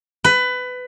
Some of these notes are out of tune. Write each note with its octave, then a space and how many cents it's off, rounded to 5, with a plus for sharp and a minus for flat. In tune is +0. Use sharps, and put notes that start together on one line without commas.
B4 +20